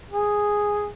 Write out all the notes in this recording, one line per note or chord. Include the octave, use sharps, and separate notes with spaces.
G#4